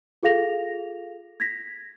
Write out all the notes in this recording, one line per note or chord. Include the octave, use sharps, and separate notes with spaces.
F4 G#4 A4 F5 A#6 F7
G#6 A#6 B6